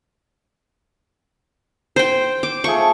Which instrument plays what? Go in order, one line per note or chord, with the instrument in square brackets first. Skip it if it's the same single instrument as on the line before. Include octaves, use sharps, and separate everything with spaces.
[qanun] C5 G5
D6
[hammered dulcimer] F3 A3 G#4 [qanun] C#6